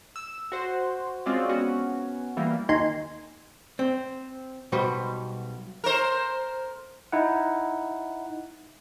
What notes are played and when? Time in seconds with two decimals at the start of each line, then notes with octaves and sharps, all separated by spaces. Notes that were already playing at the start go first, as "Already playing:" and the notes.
0.16 E6
0.52 F#4 C5
1.26 G#3 C4 C#4 F4 F#4 D5
1.49 B3 C#4 F#4
2.37 E3 G3 A#3
2.69 D#2 D#4 G#5 C6
3.79 C4
4.72 B1 B2 G3 F#4 B4 C5
5.84 A#4 C5
7.12 D#4 E4 F#5